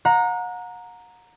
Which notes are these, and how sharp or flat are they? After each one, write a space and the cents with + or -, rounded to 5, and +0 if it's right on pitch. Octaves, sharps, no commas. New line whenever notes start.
F#5 -35 A#5 +0